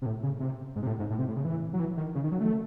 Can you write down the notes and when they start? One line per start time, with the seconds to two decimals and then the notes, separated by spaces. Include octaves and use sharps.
0.02 C3
0.06 A2
0.23 C#3
0.40 C3
0.76 G#2
0.83 C3
0.87 A2
0.99 G#2
1.10 A2
1.19 C3
1.28 A2
1.36 C#3
1.45 E3
1.73 F#3
1.79 E3
1.97 D#3
2.15 C#3
2.24 D#3
2.32 F#3
2.40 A3